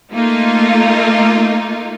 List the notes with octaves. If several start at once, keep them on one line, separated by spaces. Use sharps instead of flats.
A3 A#3 D#4 F4